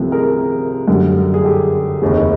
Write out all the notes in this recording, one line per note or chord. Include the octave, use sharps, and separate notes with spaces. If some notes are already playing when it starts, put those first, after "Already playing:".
Already playing: C2 C3 F3 A3
G#4 A#4
F#2 D3 G3
G#4
G4 A4
F1 D#2 C#3